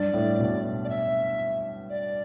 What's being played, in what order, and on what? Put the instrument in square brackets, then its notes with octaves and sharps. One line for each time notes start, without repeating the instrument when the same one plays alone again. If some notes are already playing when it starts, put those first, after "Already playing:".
Already playing: [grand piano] G2 [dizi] D5
[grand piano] A2
B2
[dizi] D5
E5
D5